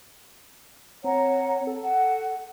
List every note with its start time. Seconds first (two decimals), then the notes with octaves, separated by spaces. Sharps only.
1.04 C4 C#5 F#5 A#5
1.67 A4
1.82 F#5